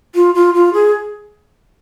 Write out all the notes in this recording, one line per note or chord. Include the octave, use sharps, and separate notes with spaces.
F4
F4
F4
G#4